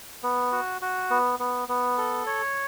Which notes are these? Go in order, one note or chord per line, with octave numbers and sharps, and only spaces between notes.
B3
F#4
F#4
B3
B3
B3
A4
C#5